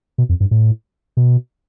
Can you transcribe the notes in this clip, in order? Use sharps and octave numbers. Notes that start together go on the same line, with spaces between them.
B2
F2
G2
A2
B2